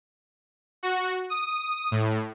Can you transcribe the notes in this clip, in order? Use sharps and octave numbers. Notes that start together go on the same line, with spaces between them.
F#4
D#6
A2